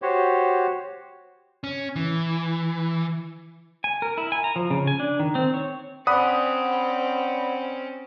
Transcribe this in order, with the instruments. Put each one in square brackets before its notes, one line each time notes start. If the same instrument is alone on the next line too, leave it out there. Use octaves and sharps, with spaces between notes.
[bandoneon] F#4 G4 C5 C#5
[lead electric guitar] C#4
E3
[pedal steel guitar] G#5
A#4
E4
G#5
A#5
F3
C#3
G#5
D4
D#3
C4
C#5
[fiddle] C4 C#4 [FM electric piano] D5 F#5 B5 [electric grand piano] D#6